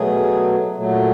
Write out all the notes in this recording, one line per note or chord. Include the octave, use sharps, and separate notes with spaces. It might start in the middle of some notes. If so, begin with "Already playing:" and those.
Already playing: B2 F#3 A3 G#4
A#2 F#3 A3